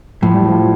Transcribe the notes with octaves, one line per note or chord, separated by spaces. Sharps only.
A2 F3
G3
F3